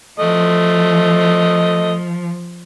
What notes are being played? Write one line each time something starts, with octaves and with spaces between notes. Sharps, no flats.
F3 A3 D#5